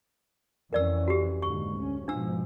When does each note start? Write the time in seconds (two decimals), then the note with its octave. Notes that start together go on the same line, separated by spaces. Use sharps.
0.73 F2 E3 C#4 A#4 D5 E6
1.08 F#4 G4
1.42 D#2 G#2 D3 C#6
1.74 D2 C#4
2.08 G#2 B2 F3 D4 E6